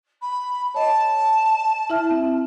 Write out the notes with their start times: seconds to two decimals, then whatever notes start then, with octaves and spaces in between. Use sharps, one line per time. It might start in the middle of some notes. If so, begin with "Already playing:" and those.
0.22 B5
0.74 C#5 D#5 A5
1.90 E4 E5 F6
2.11 C4